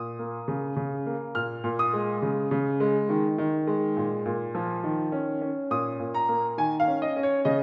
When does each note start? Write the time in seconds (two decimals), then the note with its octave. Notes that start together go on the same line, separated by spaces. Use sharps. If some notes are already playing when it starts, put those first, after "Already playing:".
Already playing: A#2 D#6
0.19 A#3
0.48 C#3
0.76 C#3
1.06 A#3
1.35 A#2 F6
1.64 A#2
1.79 D#6
1.93 G#3
2.22 C#3
2.51 C#3
2.80 G#3
3.09 D#3
3.38 D#3
3.67 G#3
3.97 A#2
4.26 A#2
4.55 F3
4.84 D#3
5.12 C#4
5.42 C#4
5.71 A#2 D#6
6.00 A#2
6.14 A#5
6.28 A#3
6.58 D#3 G#5
6.80 F5
6.88 C#4
7.02 D#5
7.16 C#4
7.23 C#5
7.45 C#3 D#5